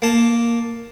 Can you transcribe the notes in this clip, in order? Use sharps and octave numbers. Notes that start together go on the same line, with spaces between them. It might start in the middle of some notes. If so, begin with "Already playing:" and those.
A#3 A5